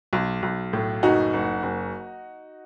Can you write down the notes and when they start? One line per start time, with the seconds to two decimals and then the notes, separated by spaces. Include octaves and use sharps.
0.13 B1
0.43 B1
0.73 A2
1.03 F#1 D#4 F#4
1.33 F#1
1.63 F#1